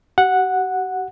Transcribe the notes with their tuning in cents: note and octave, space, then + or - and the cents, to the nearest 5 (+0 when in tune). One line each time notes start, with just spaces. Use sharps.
G4 -40 F#5 -5